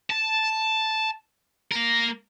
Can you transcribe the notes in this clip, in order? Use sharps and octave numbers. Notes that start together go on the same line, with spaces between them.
A5
A#3 A#4